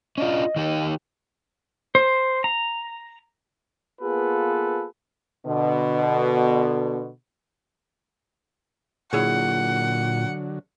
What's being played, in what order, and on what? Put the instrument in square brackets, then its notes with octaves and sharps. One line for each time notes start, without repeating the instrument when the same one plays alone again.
[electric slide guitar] C#4 D4 F4 [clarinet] D#5
[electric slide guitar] D#3 D#4 G4
[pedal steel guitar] C5
A#5
[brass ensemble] A#3 B3 F4 G#4 A4 B4
[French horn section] B2 D3
[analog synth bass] A#2 [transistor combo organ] D3 F#3 [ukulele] E4 G#4 C#5 [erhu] F#5